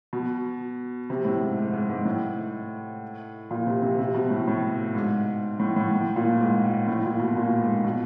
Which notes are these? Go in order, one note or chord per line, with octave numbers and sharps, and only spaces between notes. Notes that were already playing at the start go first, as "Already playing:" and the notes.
B2
C3
A2
G#2
G#2
G#2
G#2
A2
A#2
C3
C3
C3
B2
A2
A2
G#2
A2
A2
A2
A#2
G#2
A2
A#2
B2
A#2
G#2
B2